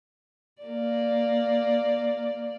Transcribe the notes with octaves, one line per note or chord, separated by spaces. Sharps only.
A#3 D5